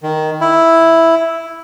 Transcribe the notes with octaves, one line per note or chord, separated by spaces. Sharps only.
D#3
E4